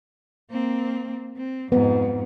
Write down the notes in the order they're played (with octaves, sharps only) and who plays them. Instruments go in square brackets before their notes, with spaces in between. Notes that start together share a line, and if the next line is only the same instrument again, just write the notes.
[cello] A#3 C4
C4
[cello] F2 G#2 [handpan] B3